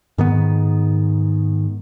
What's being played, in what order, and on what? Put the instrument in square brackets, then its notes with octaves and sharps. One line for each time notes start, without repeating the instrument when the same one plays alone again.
[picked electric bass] G#2 D#3 B3